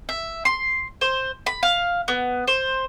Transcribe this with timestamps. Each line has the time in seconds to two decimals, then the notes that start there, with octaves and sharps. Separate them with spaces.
0.09 E5
0.45 C6
1.01 C5
1.46 B5
1.63 F5
2.08 B3
2.48 C5